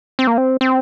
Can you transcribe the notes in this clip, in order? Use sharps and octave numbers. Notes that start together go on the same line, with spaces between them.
C4
A#3
C4
C4